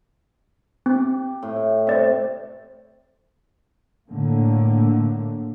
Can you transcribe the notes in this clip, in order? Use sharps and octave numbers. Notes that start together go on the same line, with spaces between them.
C4 G4
A2
C3 C5 D5 E5
A2 D3 A#3